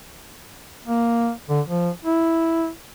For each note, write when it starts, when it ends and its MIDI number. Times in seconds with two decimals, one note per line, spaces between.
0.87 1.31 58
1.49 1.61 50
1.67 1.90 53
2.05 2.69 64